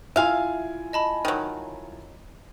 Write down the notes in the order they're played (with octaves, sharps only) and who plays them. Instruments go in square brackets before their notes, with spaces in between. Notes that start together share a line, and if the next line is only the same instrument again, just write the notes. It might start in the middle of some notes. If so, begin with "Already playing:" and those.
[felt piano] E4 F4 G#5 [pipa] E5 F5
[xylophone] D#5 A5 B5
[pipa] D#3 F#3